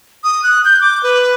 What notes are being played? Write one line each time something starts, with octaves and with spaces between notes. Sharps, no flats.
D#6
F#6
G6
D6
B4